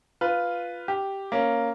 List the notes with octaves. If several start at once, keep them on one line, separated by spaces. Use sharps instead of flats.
F4 B4
G4
A#3 C#4